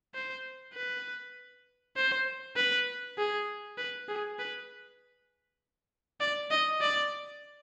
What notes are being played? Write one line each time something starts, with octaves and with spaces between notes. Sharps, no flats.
C5
B4
C5
B4
G#4
B4
G#4
B4
D5
D#5
D5